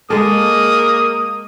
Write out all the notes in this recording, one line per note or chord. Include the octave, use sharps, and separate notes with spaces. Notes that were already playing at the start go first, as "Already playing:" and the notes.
G#3 A#3 A4 D#6